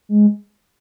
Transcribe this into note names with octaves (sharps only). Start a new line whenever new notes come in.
G#3